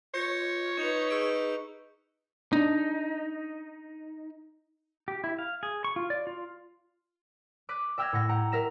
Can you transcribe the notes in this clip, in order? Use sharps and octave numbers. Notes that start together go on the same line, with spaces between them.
F4 C#5 G6 A#6 C#7
D#4 B4 C#6 G6 F7
G#4 E6 D7
D4 D#4
G4
E4
F5
G#4
C#6
F4
D5
F4
D6 F#6 B6 D#7
E5 G5 E6 F6 G#6 A#6
A2 F#5 A#6
F#5 G5 A#5
A#4 E5 A#6 E7